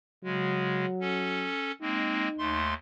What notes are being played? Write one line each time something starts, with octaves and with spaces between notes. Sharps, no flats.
C#3 F#3 G#3
C#4 A4
G#3 A#3 C4 D#4
D#2 A3 C6